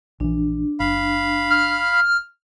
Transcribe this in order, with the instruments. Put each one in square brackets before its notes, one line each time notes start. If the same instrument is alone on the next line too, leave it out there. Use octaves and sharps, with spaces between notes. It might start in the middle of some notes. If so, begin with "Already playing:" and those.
[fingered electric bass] A#1 E3 [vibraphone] D4
[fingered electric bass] F#1 [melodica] F5 B5
[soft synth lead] F6